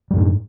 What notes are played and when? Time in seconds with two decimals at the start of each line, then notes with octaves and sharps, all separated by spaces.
0.11 G3
0.14 F#2
0.16 A2